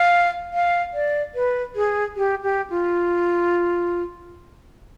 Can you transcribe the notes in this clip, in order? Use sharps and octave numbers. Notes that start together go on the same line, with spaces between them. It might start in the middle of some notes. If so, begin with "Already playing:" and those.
Already playing: F5
F5
D5
B4
G#4
G4
G4
F4